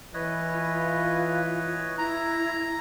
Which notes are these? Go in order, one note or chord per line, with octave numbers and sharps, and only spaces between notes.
E3 B4 C#5 D#5
F4
E4 A#5